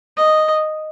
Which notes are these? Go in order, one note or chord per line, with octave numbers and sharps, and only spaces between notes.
D#5